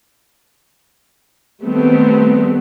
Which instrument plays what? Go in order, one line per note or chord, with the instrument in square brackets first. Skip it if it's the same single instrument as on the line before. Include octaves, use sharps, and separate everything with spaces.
[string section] D#3 G3 A3 B3 C4